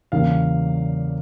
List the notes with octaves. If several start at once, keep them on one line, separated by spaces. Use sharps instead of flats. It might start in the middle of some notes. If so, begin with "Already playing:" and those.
E2 C#3 G3 A#3 F5